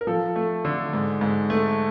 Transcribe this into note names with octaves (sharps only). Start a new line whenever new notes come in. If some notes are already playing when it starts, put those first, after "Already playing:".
A#4
F3 A4
A3
D3
G#2
G#2
A3